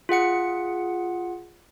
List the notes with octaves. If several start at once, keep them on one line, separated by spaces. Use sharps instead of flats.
F4 G#4 F#5 C#7